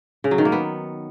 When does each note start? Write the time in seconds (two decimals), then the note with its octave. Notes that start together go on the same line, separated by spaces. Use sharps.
0.24 C#3
0.31 F#3
0.38 D#3
0.45 A#3
0.52 B3